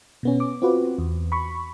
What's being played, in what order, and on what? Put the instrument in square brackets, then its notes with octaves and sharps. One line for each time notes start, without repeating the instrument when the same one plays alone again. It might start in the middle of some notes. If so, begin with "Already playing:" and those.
[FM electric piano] B2 B3 C#4
D6
C4 F4 F#4 B4
E2
B5 C#6